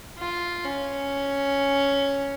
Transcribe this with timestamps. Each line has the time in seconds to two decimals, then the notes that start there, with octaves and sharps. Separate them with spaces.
0.18 F4
0.65 C#4